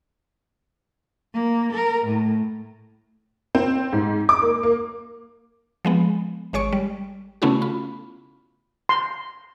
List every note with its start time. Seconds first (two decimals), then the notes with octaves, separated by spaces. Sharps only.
1.34 A#3
1.73 A#4
2.05 A2
3.55 C4
3.93 G#2
4.29 D6
4.42 A#3
4.63 A#3
5.85 F3 G#3 B3
6.53 G#1 G#3 C#5 C#6 D7
6.73 G3
7.42 C#3 A3 B3 C#4 E4 F#4
7.62 F4 B5
8.89 C6